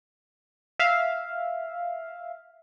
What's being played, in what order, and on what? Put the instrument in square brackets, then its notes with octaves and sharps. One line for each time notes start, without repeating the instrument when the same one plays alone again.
[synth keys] E5 F5